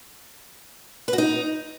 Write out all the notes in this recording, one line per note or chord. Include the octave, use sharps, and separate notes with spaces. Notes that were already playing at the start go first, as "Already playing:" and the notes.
B4
F#4
D#4